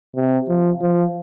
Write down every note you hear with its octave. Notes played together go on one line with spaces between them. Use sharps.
C3
F3
F3